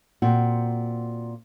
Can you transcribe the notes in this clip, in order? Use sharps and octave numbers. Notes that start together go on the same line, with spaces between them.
A#2 C4 F#4